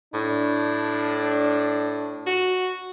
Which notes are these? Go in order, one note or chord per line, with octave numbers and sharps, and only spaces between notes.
A2 D4
F#4